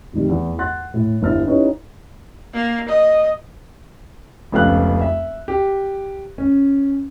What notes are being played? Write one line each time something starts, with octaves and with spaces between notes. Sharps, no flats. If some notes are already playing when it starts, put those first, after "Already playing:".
F1 C3 D#3 G3
E2
F#5 C6 F#6 A6
A2
G1 G2 B3 E4 F6 A6
C#4 D#4 E4 G4 B4 C#5
A#3
D#5
F1 C#2 F3 B3 F5 F#6
E5
G4
C#4